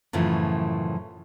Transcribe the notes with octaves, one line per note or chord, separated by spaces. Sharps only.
F#2 A2 C#3 E3 F3